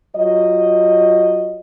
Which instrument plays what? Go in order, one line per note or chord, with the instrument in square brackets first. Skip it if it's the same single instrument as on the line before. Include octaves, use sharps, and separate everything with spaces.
[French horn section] F#3 F4 D#5